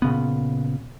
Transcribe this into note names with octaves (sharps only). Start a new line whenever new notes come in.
A#2 C#3 B3